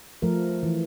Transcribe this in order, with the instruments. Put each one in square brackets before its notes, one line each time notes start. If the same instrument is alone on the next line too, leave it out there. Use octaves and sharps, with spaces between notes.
[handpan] F3 A3 A#4
E3